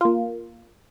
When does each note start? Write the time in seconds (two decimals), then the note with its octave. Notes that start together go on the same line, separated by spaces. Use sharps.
0.01 A#3 F4